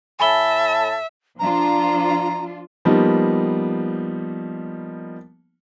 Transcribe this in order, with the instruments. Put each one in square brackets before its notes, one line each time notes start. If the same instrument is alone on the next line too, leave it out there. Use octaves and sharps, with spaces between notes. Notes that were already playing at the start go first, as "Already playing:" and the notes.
[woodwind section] A2 A5 [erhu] E5 [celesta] G#5 B5 G7
[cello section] F3 D4 F4 [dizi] A#5
[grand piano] F3 G3 A#3 B3 D#4